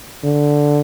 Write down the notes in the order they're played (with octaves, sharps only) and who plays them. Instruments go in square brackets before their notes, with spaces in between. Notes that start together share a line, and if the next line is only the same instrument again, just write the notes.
[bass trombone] D3